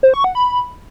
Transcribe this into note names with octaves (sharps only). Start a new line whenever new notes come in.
C5
C#6
F#5
B5